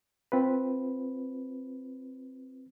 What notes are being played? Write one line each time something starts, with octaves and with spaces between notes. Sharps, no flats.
C4 F4 B4